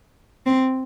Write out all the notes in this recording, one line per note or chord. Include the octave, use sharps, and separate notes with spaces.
C4